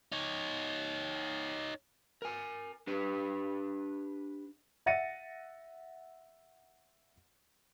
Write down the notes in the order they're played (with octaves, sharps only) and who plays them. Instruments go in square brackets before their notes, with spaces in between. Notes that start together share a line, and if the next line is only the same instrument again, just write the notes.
[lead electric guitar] D#4 C#5
[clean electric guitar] A#4 G#5
D4 G4 B4
[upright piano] E5 F#5 A6 A#6 C#7 D#7